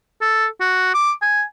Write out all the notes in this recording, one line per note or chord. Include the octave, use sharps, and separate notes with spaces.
A4
F#4
D6
G#5